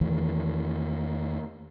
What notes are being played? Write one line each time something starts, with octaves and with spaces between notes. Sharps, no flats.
E2 D#3 E3 A3